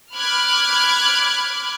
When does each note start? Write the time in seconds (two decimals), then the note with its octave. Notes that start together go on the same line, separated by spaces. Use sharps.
0.14 B5 D6 F6 F#6 G#6